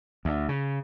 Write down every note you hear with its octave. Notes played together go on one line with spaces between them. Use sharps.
D2
C#3